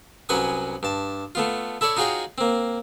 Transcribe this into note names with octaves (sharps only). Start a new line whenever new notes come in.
C2 F#3 C#4 B4 G#5 D#6
G2 A5
A3 B3 F4
E4 A4 C#5 D5
D#4 F4 F#4 G#4 C#5 G5
A#3 C4